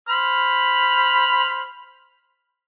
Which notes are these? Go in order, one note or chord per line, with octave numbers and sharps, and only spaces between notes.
C5 B5 F6